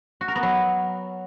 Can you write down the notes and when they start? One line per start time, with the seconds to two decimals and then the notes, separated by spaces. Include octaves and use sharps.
0.21 F#4
0.28 A#4
0.35 B3
0.43 F#3